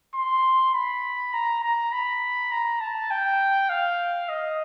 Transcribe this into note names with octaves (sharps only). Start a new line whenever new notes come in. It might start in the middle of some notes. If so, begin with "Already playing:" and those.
C6
B5
A#5
A#5
B5
A#5
A5
G5
F5
D#5